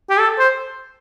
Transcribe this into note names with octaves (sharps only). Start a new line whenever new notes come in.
G4
A4
C5